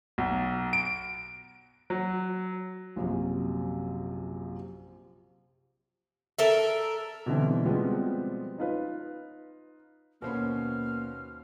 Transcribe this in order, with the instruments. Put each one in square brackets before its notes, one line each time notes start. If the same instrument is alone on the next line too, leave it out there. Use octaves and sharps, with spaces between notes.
[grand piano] B1
D7
F#3
[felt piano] A#1 F#2 C3
[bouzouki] A4 A#4 E5
[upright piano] B2 D3 E3 G3 C4
F3 G3 G#3 B3 C4 F#4
D#4 F4 B4
[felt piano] D#2 C5 B5 [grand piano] B2 C#4 [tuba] A#3 [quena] F6